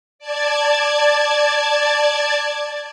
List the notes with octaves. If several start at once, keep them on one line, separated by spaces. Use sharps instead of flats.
D5 A5 G#6